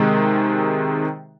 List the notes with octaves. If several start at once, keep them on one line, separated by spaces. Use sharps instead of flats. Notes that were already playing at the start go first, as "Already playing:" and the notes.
Already playing: C3 D#3 G#3